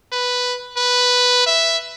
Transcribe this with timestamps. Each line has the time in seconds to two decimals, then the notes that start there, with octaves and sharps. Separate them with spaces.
0.13 B4
0.77 B4
1.47 E5